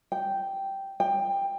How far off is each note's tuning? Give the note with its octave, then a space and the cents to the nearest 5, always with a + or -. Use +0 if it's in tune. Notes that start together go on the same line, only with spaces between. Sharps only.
G5 -5
G5 +15